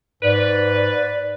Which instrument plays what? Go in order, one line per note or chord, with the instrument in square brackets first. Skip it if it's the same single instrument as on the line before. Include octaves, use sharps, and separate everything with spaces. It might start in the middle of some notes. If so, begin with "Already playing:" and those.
[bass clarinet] G#2 [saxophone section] B4 [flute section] D5